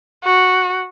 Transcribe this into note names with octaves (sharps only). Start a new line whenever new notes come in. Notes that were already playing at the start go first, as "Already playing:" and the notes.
F#4